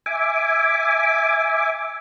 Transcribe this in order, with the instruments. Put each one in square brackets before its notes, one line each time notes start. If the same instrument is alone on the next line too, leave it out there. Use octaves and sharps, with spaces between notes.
[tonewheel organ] E5 G#5 D6